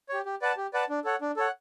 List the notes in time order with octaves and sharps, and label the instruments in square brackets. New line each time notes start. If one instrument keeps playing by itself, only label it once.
[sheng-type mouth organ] G4 C#5
G4
B4 D5 F#5 A5
G4
B4 D5 F#5 A5
D4
A4 C#5 F#5
D4
A4 C#5 F#5